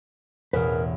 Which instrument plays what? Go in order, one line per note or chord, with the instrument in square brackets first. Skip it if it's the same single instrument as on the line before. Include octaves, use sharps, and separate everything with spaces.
[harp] A1 E2 B2 [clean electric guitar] A#4 B4